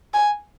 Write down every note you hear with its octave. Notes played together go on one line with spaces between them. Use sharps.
G#5